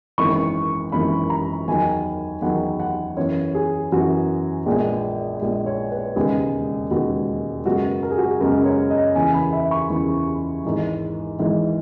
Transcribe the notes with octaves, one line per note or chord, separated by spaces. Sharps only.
G#1 F#2 E3 A#3 C#6
G#1 F#2 E3 A#3 B5
A#5
E2 D#3 F#3 G#5
E2 D#3 F#3 F#5
F#5
F#2 E3 B3 C#5
G#4
F#2 E3 B3 F#4
A#1 A#2 G#3 B3 G#4
A#1 A#2 G#3 B3
C#5
B4
E1 D#2 C#3 G#3 B3 G#4
E1 D#2 C#3 G#3 B3 F#4
F#2 C#3 G#3 B3 F#4
A#4
G#4
F#4
G#4
F#2 C#3 G#3 B3 A#4
C#5
D#5
E2 C#3 E3 B3 G#5
B5
E5
C#6
E2 C#3 E3 B3
G#1 G#2 E3
G#1 G#2 E3